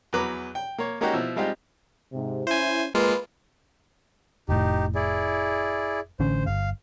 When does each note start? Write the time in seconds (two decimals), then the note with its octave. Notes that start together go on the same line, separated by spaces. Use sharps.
0.13 E2 F#3 B4 A#5 D6
0.55 G5
0.78 A#3 C#5
1.01 G#3 A#3 C#4 D#4 F#4 G4
1.14 B2 F3 E4
1.36 G3 G#3 C4 D#4 F4 G4
2.13 G#2 C3
2.47 C#4 E4 C5 G#5
2.95 G#3 A#3 F4 B4
4.49 F1 A2 D#4 G4
4.95 E4 G#4 D5
6.20 A1 D3 C#4 C5
6.46 G1 F5